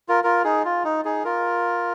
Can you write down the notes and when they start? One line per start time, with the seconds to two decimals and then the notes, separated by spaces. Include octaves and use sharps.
0.08 F4 A#4
0.24 F4 A#4
0.44 D#4 G#4
0.65 F4
0.85 D#4
1.05 D#4 G#4
1.24 F4 A#4